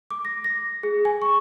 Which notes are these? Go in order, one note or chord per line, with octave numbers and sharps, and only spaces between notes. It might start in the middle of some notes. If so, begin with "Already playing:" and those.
D6
A#6
A#6
G#4
G#5
C#6